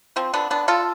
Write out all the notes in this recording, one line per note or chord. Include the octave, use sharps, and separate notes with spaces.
F3 C4
D3 B3 D4
D3 B3 D4
D3 F4 A4